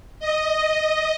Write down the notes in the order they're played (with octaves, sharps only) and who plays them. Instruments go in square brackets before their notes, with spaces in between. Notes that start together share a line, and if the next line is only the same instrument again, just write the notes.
[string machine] D#5